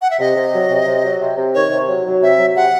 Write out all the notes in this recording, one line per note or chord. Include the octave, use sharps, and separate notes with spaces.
F#5
E5
C3 D#5
C3
F#3
C3
C3
F#3
C3
C3
D#3 C#5
C3
F#3
F#3
C3 E5
F#3
C3 F#5